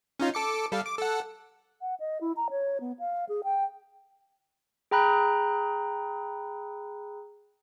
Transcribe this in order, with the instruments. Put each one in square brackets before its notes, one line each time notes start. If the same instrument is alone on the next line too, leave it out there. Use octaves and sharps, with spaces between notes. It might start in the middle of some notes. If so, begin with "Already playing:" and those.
[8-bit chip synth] C#4 D#4 F4
A4 D6 C#7
G3 A4 F5
D6
A4 F#5
[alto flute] F#5
D#5
E4
A#5
C#5
B3
F5
G#4
G5
[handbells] G#4 G5 A#5 B5 F#6